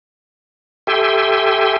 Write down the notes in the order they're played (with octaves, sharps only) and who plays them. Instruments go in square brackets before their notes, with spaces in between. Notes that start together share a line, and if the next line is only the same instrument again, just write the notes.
[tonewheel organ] G4 A4 E5 G5 G#5 C6